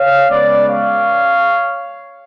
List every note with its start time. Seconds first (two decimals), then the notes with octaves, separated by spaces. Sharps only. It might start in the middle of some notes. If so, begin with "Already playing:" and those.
Already playing: C#5 F5
0.29 C#3 G#3 B3 B4 D5
0.67 C#5 F5